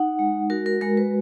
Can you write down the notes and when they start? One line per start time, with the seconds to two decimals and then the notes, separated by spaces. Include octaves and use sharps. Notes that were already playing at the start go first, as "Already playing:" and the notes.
Already playing: D#4 F#5
0.19 G#3
0.50 F#4 A#4
0.66 A#4
0.81 G#3 A#4
0.97 B4